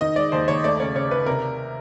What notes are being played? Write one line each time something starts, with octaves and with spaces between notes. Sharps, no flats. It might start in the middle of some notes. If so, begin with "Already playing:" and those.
D#3 D#5
G#3 D5
D#2 C5
D#2 C#5
A3 D5
C#3 C#5
C#3 C#5
C#3 B4
C3 A#4